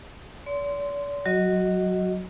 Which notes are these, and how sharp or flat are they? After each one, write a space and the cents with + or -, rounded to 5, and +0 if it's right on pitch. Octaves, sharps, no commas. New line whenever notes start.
D5 -45 C6 -15
F#3 +0 F#4 +0 D#5 +5